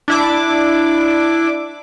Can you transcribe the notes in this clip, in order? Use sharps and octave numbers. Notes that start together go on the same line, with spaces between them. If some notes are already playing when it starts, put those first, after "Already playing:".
D4 E4 D6